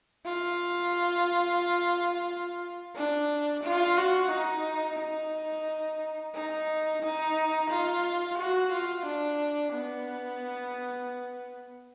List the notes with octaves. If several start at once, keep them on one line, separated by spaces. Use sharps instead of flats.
F4
D4
F4
F#4
D#4
D#4
D#4
D#4
F4
F#4
F4
D4
B3